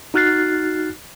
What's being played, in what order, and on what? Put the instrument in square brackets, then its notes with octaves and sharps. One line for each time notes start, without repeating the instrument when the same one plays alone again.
[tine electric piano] D#4 F#4 F6 F#6 A6 C7